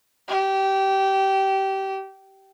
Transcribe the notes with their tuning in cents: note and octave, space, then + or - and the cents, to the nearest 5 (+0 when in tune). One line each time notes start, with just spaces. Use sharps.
G4 -20